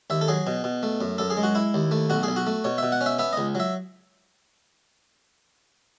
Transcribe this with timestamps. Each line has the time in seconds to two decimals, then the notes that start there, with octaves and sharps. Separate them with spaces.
0.10 D#2 E5
0.21 A4
0.28 F#3 G#4
0.47 B2
0.64 B2
0.83 A3
1.01 F#2
1.18 F#2 A4
1.30 G#4
1.37 G#3
1.43 F#4
1.55 E4
1.74 D#2
1.91 A3
2.10 B1 F#4
2.23 G#4
2.28 B1
2.36 F#4
2.47 A3
2.64 B2 C#5
2.78 B2 E5
2.92 F#5
3.01 C#4
3.06 E5
3.19 B3 E5
3.33 C#2 D#5
3.55 F#3 E5